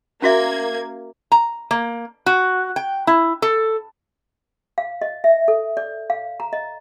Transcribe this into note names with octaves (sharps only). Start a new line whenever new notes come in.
A#3 C#4 F#4 E5 G#6
A#5
A#3
F#4
G5
E4
A4
F5
D#5
E5
A4
D5
F5
A#5
D#5